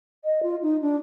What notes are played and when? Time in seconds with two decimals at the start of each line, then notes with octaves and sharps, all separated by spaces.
0.25 D#5
0.43 F4
0.62 D#4
0.82 D4